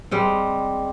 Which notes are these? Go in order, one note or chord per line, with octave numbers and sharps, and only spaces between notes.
G3 G#3 C4